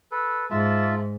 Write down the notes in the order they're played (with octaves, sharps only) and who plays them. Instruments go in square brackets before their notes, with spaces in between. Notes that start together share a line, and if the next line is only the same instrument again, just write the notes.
[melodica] A4 B4
[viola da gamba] G#2 [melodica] F4 E5 A5